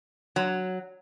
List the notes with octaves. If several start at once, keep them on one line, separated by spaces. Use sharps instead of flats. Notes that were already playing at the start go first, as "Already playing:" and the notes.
F#3